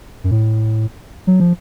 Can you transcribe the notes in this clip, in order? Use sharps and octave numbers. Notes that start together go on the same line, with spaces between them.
F#2
A2
F#3
F3